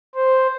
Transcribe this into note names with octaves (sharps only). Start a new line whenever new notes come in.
C5